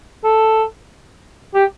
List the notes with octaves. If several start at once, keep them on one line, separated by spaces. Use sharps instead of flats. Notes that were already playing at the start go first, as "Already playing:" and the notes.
A4
G4